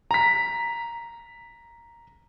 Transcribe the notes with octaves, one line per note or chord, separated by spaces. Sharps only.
A#5 B6